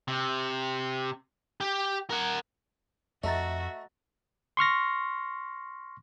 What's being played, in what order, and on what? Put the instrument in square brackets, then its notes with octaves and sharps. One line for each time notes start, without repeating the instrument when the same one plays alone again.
[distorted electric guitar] C3
G4
A#4 F#5
[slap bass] F2 [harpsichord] A3 [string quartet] F#4 E5 [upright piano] D#5 A#5 A6
[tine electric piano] C6 C#6 F6 A#6